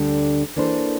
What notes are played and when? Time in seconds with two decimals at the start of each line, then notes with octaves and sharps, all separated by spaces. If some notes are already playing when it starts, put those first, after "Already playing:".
Already playing: D2 D3 G3 D4
0.57 E3 A#3 D4 A4 C5